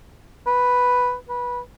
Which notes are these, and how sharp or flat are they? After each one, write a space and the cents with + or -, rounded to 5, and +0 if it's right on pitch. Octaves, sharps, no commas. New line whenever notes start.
B4 +0
B4 -15